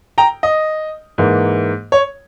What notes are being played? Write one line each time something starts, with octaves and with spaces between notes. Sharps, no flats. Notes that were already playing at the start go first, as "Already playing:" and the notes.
G5 A#5
D#5
G#2 E3 A#3
C#5